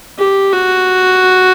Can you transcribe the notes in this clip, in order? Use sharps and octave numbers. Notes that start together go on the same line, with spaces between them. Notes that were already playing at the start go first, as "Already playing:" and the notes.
G4
F#4